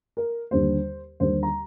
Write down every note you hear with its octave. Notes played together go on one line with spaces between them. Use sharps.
A#4
D#2 D3 G3 C5
D#2 D3 G3 A#3 C5
A#5